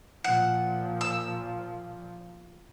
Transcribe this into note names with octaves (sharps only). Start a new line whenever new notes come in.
A#2 F3 F#5
E6